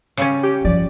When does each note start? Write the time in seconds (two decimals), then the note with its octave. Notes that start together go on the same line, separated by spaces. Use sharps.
0.17 C#3 G3 C#4
0.43 G4
0.65 G2 F3 D5